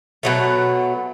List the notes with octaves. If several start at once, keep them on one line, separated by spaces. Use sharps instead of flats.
B2 F#3 A3